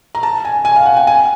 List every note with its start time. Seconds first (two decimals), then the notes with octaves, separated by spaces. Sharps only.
0.15 A#5
0.23 A5
0.45 G#5
0.65 G#5
0.76 F5
0.86 F#5
0.97 G5
1.07 G#5